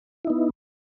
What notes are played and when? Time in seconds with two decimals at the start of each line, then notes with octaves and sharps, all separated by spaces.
0.25 E4
0.27 D#4
0.30 B3